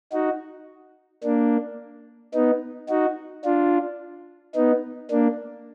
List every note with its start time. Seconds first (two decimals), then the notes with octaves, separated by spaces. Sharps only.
0.13 D#4 F#4
1.24 A#3 D4
2.35 B3 D#4
2.90 D#4 F#4
3.45 D4 F4
4.55 B3 D#4
5.11 A#3 D4